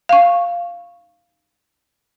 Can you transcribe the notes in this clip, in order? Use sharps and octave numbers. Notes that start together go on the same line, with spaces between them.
F5 C#6